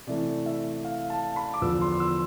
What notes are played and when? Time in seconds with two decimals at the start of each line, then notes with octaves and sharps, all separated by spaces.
0.07 C3 E3 A3 D5
0.46 E5
0.85 F5
1.10 A5
1.36 B5
1.54 D6
1.61 E2 D3 F3 B3 E6
1.81 C6
2.00 E6